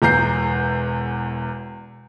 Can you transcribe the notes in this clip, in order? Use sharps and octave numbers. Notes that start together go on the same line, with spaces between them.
E1 E2 A#5 G6 C7